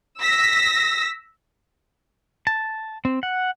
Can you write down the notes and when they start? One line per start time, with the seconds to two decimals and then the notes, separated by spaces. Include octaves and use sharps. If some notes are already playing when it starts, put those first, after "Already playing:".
0.21 E6 A#6 B6
2.47 A5
3.05 C4
3.23 F#5